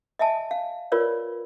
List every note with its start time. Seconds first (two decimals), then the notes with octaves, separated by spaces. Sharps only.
0.19 D#5 E5 G#5 A5
0.51 F5
0.92 F4 A#4 B4 C#5 D5